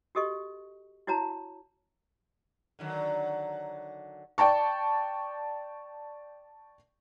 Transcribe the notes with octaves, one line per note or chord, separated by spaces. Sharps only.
F#4 G4 A4 D#5 C#6
E4 F#4 C#5 A5 A#5
D3 D#3 F#3
D5 G5 A5 C#6